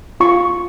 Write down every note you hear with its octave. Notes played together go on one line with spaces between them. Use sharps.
F4 C#6